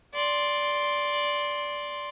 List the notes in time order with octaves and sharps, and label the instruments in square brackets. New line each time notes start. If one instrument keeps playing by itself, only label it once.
[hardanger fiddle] D5 C6